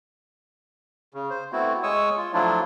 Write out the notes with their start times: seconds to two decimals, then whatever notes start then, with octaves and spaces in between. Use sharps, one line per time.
1.14 C#3
1.30 C5
1.52 A3 B3 C4 E4 F#4
1.83 G#3 C#5 C#6 D#6 E6
2.17 F4
2.34 F3 F#3 A3 D4 E4 F4